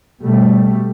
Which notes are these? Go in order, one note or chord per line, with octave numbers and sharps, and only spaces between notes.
B2 G3 A3